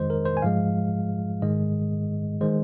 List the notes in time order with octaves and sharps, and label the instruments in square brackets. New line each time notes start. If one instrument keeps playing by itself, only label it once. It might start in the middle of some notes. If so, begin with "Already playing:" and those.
Already playing: [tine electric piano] F2 D#3 G#3 C5 D#5
A#4
C5
G#5
G#2 F3 G#3 F5
G#2 D#3 G#3 D#5
D#3 G#3 C5